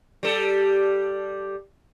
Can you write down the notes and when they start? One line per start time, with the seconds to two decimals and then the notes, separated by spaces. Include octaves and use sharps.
0.23 G3 A4